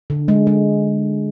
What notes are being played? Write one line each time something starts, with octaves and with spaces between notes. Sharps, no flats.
D3
G#3
G#3